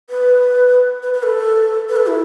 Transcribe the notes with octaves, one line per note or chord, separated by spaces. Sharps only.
B4
B4
B4
A4
B4
A4
E4